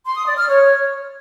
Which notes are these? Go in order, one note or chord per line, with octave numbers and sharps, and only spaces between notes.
C6
D#6
D5
F6
C#5